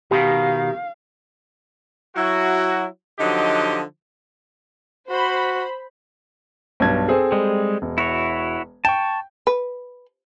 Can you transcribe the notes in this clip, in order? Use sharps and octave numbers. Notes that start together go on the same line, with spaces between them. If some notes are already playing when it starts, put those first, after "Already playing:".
B2 D#3 G4 F5
F#3 E4 F#4
D3 F3 F#3 D#4 G4 D#5
F#4 C5 B5
B1 G2 G#6
C4 G#4 A4
G3 G#3
E1
E4 F#4 C#5
G5 A5 C#6
B4